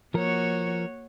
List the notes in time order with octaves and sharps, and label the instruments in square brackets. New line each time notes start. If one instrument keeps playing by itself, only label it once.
[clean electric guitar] F3 A#4 [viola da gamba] A#3 F#4 C#5